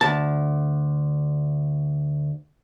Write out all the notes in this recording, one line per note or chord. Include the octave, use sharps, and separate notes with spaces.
D2 A5